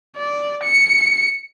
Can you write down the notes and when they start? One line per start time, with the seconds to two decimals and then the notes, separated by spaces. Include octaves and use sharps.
0.17 D5
0.64 C#7